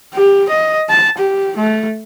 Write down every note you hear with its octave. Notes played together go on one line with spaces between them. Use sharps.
G4
D#5
A5
G4
A3